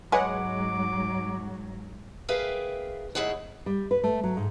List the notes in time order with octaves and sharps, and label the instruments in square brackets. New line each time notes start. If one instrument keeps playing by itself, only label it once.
[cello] G#2 F#3 [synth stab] G#3 C#5 F#5 [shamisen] B4 G#5 [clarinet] D6
[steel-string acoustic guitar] G#4 A#4 B4 E5 F5 G5
A2 D#3 E4 G#4 C#5 F#5
[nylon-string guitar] G3
B4
A3
F#3
G#2